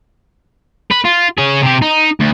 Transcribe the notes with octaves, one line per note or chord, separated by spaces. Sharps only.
B4
F4
C#4 G#4
C3 G4
D#4
D2